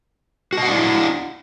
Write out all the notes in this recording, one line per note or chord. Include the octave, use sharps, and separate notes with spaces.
D4 E4 F#4 D#5 F#5